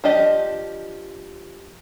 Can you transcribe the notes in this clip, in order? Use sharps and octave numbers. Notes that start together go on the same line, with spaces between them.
F3 D4 G4 D#5